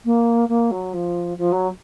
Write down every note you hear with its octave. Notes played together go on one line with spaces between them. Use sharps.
A#3
A#3
F#3
F3
F3
F#3